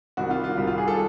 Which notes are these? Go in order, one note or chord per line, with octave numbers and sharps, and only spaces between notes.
C2 C3 D#3 G3 F#4
F4
F4
C2 C3 D#3 G3
F4
G#4
A4